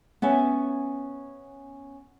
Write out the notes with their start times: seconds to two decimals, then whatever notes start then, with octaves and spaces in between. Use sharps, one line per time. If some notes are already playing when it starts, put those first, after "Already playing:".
0.22 B3 C#4 E5 G#5